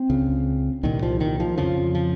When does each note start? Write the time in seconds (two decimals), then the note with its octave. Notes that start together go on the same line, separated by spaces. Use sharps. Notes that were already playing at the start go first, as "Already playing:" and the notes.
Already playing: C4
0.10 C#2 C#3
0.83 C2 A#2 D#3
1.03 F3
1.20 D#3
1.40 F3
1.58 F2 C#3 F3
1.95 F3